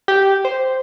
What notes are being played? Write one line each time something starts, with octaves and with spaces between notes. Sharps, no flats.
G4
C5